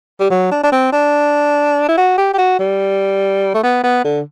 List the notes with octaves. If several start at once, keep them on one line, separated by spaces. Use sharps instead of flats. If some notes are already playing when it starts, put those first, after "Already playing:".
G3
F#3
D4
D4
C4
D4
E4
F#4
G4
G4
F#4
G3
A3
B3
B3
D3